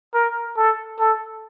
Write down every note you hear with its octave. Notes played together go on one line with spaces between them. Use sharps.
A#4
A4
A4